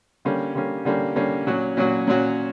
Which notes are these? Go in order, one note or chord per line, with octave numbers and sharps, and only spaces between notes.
D3 G3 A#3 C#4
D3 G3 A#3 C#4
D3 G3 A#3 C#4
D3 G3 A#3 C#4
A#2 F#3 C#4 F#4
A#2 F#3 C#4 F#4
A#2 F#3 C#4 F#4